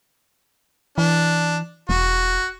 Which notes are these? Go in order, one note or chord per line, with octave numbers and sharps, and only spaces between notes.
E3 D4
E1 F#4